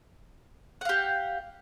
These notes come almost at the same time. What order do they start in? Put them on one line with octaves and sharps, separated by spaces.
F#5 F5 G4